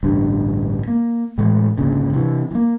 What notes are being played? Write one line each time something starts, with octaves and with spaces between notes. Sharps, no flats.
A1 D2 G2
A#3
A2 E3 G#3 A3
G#1 D2 A#2 C#3
C3 E3
E3 A#3